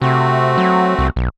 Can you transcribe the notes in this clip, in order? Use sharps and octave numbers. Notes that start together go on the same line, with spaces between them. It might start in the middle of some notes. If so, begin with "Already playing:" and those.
C3 A3 C4 F#4
F#3
C2
B1